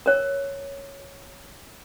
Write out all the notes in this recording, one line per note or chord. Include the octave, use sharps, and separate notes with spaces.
A#4 C#5